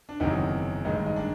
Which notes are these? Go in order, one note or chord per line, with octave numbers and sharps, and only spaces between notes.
D4
F#1 E2 C3 D#3 F#3 D#4
A1 G2 D#3 G#3 D#4
D#4
D4